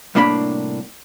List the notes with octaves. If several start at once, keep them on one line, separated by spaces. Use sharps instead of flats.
C2 A2 A#3 D4 A#5 B5